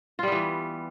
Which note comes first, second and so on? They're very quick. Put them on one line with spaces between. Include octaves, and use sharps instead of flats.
F4 G3 B3 E3